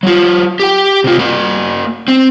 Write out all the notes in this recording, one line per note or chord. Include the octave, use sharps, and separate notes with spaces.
F#3 F4
G4 G5
C3 F4
A#3 F#4
C4